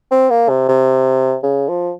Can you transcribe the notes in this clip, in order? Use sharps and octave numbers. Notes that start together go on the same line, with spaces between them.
C4
A#3
C3
C3
C#3
F3